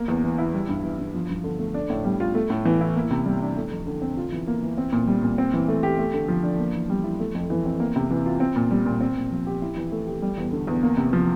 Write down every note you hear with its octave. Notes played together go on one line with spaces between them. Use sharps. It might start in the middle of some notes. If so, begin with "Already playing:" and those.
Already playing: A#3
E2
E3
E4
G3
G2
E3
G2
F3
G2
D3
A3
D4
A2
G3
F4
A3
A2
E3
E4
A#3
C3
G3
D4
A3
F2
D3
C4
F4
E3
A#3
E3
C4
A#2
G3
A#2
C4
E3
A3
G4
A3
D3
F3
D4
A#3
E3
G3
E4
A3
F2
E3
C4
A#3
C3
E3
F4
C4
A#2
G3
A#2
C4
A#2
F3
G4
E4
E3
A3
G4
G3
E2
D3
E2
A#3
C3
F3